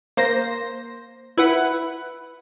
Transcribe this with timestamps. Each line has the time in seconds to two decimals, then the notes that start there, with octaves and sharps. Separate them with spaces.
0.17 A#3 C5 A#6
1.37 E4 B4 F#5